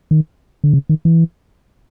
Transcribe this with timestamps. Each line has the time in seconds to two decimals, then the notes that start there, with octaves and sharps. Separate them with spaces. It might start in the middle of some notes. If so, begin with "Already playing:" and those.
0.11 D#3
0.64 D3
0.74 C#3
0.89 D#3
1.05 E3